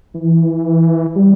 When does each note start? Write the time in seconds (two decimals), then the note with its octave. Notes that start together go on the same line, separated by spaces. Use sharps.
0.14 E3
1.16 G3